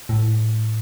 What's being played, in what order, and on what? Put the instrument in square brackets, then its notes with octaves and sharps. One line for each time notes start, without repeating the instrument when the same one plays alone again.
[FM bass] A2